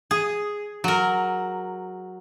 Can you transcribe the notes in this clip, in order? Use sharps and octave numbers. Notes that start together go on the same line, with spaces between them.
G#4
F#3 A#4